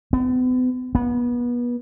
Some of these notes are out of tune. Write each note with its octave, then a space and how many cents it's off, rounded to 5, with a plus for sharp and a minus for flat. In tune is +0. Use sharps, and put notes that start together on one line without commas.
B3 +40
B3 -30